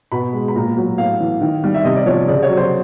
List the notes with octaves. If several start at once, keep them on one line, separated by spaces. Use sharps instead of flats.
B2 B5
G#3
B5
A#2 A#5
F#3
A2 F5
E3
D#3
G3
E5
C3 D#5
D5
F3 C#5
C#3 D5
C#5
F#3
C5